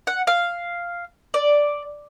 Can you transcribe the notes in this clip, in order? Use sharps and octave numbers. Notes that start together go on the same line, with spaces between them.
F#5
F5
D5